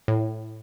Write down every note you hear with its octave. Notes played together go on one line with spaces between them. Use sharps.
A2